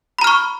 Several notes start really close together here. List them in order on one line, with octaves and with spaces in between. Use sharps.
B5 A#5 F6 C#6